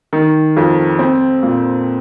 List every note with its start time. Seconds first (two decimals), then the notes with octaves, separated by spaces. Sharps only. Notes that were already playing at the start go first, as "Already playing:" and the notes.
0.13 D#3
0.57 F2
0.99 C4
1.43 A#2